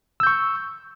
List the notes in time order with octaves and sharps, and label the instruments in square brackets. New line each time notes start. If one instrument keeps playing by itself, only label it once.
[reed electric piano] E6
G6
C#6